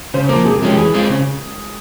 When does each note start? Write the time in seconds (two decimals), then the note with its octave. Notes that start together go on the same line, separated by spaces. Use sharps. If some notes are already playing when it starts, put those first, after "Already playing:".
0.14 C#3 C5
0.29 F3 A#3 A#4
0.45 C3 G#4
0.56 G#4
0.62 F3 G#3 C#4 G4
0.77 E3 G#4
0.94 G#3 C4 F4
1.10 C#3